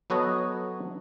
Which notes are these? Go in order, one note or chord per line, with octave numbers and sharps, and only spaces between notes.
F#3 B3 F#4 A4 C#5 D#5